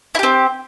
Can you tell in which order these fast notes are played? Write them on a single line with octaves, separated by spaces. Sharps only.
E4 G4 C4